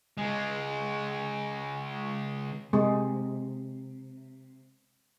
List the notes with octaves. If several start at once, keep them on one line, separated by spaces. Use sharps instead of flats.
C#3 G#3
C3 G#3